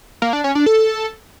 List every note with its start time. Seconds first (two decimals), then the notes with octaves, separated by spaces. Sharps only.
0.22 A#3
0.33 D4
0.44 C#4
0.55 D4
0.66 A4